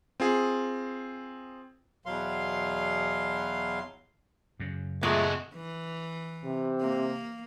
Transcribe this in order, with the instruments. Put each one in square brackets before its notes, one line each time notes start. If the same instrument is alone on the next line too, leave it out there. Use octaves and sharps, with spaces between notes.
[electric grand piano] C4 F4 G#4
[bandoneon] E2 B2 F#3 F5 C6
[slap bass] F#2 C#3
[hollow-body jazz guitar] A#2 [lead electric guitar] G#3 F#4 [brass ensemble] A3 G#4
[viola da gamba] E3
[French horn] C3
[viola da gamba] A#3